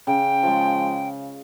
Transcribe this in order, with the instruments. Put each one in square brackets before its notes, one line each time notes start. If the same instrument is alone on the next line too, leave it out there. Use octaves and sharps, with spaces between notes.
[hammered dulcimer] C#3 [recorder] G5
[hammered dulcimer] F3 G#3